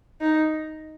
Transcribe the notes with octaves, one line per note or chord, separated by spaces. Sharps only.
D#4